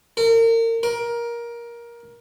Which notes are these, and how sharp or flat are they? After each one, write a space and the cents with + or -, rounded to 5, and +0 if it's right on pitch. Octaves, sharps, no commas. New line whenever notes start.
A#4 -35
A#4 +15